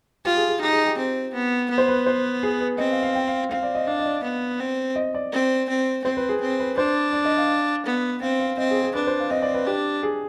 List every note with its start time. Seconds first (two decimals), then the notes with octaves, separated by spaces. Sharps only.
0.25 F4 G4
0.37 G#4
0.49 G#4
0.61 D#4 G4
0.73 G#4
0.86 G4
0.98 C4
1.34 B3
1.70 B3
1.78 C5
1.88 B4
2.06 C5
2.43 G#4
2.61 B4
2.78 C4 D#5
2.91 F5
3.03 F5
3.15 G5
3.28 F5
3.51 C4 F5
3.63 D5
3.75 D#5
3.87 D4 F5
3.99 D#5
4.06 D5
4.24 B3
4.60 C4
4.96 D#5
5.14 D5
5.33 C4
5.69 C4
6.04 C4 C5
6.17 B4
6.29 G#4
6.41 C4
6.60 B4
6.78 D4 C5
7.13 D5
7.25 D#5
7.37 F5
7.86 B3
8.22 C4 F5
8.40 F5
8.58 C4 D#5
8.71 G#4
8.82 G#4
8.95 D4 B4
9.07 C5
9.19 F5
9.31 C4 D#5
9.42 D5
9.54 B4
9.67 D4 G4
10.03 G#4